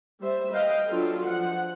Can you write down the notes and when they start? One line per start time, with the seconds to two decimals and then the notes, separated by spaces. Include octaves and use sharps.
0.21 G3 C5 E5
0.51 B4 D#5 F5 G5
0.88 F#3 D4 F4 A4
1.26 F3 F#5